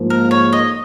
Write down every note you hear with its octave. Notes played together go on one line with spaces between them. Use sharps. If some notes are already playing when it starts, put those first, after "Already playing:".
Already playing: G#2 F3 A#3
A#4
C#5
D#5